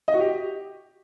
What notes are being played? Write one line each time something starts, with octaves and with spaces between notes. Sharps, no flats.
D#5
F#4
G4